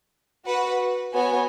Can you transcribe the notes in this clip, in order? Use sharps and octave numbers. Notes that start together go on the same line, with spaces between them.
F#4 B4 F#5
B3 F#4 C#5 G#5